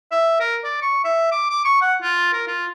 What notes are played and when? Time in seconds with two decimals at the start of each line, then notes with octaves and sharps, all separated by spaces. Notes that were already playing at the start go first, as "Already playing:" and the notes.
0.11 E5
0.40 A#4
0.64 D5
0.82 C#6
1.04 E5
1.32 D6
1.50 D6
1.65 C#6
1.81 F#5
2.02 F4
2.33 A#4
2.47 F4